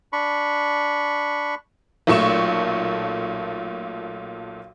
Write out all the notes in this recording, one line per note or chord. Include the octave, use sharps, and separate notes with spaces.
D4 B5 C#6
B1 A#2 A3 C#6 E7